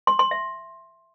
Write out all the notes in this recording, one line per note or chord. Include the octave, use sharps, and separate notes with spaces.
C6
C6
E5